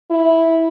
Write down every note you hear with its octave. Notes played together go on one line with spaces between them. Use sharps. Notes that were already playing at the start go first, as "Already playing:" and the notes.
E4